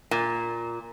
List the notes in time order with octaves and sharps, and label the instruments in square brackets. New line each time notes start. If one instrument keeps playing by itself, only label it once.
[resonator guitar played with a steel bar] A#2